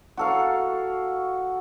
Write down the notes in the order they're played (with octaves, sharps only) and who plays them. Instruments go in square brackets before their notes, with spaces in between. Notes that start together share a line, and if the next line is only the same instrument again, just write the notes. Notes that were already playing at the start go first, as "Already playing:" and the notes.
[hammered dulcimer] F#4 A4 F5